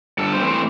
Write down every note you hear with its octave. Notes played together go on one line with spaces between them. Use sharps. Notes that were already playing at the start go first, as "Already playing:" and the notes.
G2 A4
C5
E3 A3 C4
C5